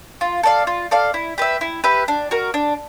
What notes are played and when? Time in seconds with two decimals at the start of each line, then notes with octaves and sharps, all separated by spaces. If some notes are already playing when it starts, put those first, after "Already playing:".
0.21 F4
0.43 A4 D5 F5
0.67 F4
0.91 A4 D5 F5
1.14 E4
1.38 G4 B4 E5
1.61 E4
1.84 G4 B4 E5
2.08 D4
2.31 F#4 A#4
2.54 D4